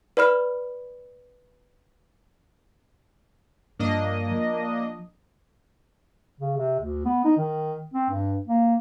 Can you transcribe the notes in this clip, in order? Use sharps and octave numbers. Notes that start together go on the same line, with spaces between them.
B4 D5 B5 F6
G2 F3 A#3 D4 D#5
F3
C#3
C3
D2
B3
D#4
D#3
C4
G2
A#3